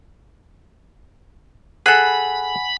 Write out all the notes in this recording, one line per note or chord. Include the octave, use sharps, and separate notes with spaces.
G#4 A4 F#5 G#5 B5 F#6